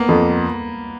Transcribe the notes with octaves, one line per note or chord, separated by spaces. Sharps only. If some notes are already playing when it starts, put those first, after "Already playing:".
Already playing: A#3 B3
F2